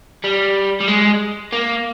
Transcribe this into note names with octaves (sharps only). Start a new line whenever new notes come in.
G3
G3
G#3
A#3